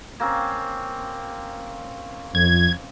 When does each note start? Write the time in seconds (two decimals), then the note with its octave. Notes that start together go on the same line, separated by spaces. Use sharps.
0.20 A#3 C4 C#4
2.35 F2 G#6